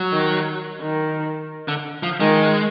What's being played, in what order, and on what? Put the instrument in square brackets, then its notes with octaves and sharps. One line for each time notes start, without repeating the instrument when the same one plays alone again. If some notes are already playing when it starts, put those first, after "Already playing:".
Already playing: [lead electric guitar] F#3
[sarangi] D#3
D#3
[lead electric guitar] D3
F3
[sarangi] D#3 [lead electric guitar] G#3